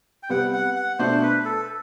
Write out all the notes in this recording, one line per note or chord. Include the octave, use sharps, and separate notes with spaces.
G5
C3 G3 B3 F#5
F#5
F#5
B2 A3 D4 C5
B4
A4